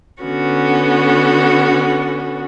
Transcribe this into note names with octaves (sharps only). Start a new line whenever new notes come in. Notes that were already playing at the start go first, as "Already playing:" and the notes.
D3 B3 C#4 F#4